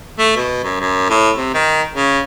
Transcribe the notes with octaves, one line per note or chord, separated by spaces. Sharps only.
A3
B2
F#2
F#2
A2
C3
D#3
C#3